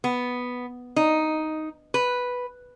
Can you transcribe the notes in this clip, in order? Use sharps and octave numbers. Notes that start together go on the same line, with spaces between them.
B3
D#4
B4